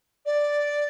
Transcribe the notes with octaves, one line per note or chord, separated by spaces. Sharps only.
D5